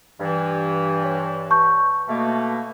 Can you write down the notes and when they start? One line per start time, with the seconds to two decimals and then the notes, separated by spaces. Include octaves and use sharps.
0.20 G2 E3
1.05 C#5
1.50 A5 C#6 G6
2.08 B2 A3 A#3